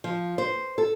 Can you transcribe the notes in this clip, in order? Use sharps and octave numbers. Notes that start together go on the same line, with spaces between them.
F3
C5
A4